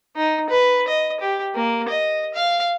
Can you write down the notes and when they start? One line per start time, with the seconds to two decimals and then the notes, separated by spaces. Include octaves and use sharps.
0.16 D#4
0.50 B4
0.88 D#5
1.21 G4
1.55 A#3
1.89 D#5
2.34 F5